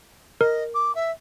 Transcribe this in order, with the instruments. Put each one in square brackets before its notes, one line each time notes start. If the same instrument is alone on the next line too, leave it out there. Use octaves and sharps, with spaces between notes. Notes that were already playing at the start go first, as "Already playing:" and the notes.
[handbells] A#4 [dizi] D#5
[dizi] D6
E5